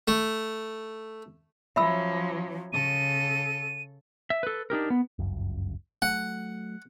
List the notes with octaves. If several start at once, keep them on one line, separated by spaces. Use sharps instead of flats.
A3
F3 F#3 C#4 E5 B5 E6
C#3 A4 D#7
E5
A4 B4
D4 D#4 G4 A#4
B3
G1 C#2 F#2
F#3 A3 F#5